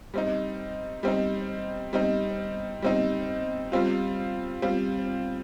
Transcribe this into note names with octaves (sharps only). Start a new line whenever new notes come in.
G3 C4 D#4
G3 C4 D#4
G3 C4 D#4
G3 C4 D#4
G3 C4 F4
G3 C4 F4